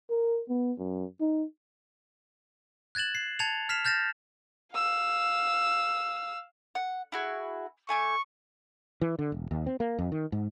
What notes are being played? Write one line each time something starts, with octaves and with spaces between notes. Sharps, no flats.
A#4
B3
F#2
D#4
F#6 G#6 A6 E7 F#7
C7
A5 G#6 A6 C#7 F7
F6 B6 C7 E7 F7
F6 G6 A6 A#6 E7
F5 E6
F#5
E4 F#4 G#4
A3 G#5 C#6 D6
E3
D3
E1
D#2
C4
A#3
F2
D#3
G#2